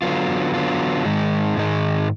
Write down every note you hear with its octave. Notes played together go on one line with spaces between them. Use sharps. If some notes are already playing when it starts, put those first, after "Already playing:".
D3 F#3 B3 F4
D3 F#3 B3 F4
G#2 D#3 G#3 D#4
G#2 D#3 G#3 D#4